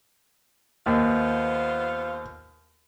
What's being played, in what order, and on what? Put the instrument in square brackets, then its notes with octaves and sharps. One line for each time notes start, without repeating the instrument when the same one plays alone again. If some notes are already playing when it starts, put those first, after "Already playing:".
[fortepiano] D#2 [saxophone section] B3 F4 C5